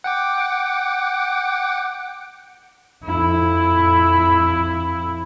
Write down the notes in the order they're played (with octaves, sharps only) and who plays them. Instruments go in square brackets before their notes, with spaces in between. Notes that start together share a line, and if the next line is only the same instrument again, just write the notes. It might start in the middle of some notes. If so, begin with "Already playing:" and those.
[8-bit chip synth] F#5 G5 D6
[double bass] F2 E4